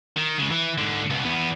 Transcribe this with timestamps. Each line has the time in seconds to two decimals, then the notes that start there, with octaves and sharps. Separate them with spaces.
0.17 D#3
0.39 C#3 G#3
0.51 E3
0.78 G#2 D3
1.10 C#2 B2
1.25 E2 B3